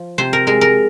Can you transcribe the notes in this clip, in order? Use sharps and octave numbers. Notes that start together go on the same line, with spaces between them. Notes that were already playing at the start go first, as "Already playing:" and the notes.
Already playing: F3
C3 C5
A#4
G#3 A#4
A#4